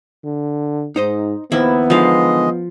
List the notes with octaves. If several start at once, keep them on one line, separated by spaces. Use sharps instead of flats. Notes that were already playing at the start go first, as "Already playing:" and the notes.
D3
G#2 D#4 C5 D#5
D#2 D#3 F3 B3 E4
E2 D3 D#3 F3 G#3 D#5 F5